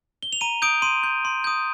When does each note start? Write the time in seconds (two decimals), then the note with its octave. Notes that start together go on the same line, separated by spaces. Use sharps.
0.23 G7
0.33 F7
0.41 A#5 D#7
0.62 D#6 G6 D7
0.82 C6 D#7
1.03 G6
1.25 C6
1.44 D#6 G6